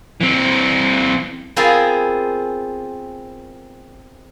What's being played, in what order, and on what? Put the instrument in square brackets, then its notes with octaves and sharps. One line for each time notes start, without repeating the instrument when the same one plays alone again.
[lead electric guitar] E3 C4
[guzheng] B3 C4 F4 G#4 A#4 G#5